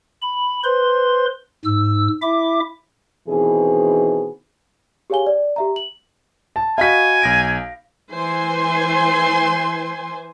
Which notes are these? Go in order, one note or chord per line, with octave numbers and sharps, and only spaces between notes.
B5
B4 C5 C6
G#2 E6
E4 E5 D6
B2 D#3 E3 C4 G#4
G4 G#4 C#5 F5 G#5 G7
D5
G4 E5 A#5
F#7
A5
F#4 D#5 F5 G#5 B5 B6
B1 A#6 D7
E3 C5 G#5 C6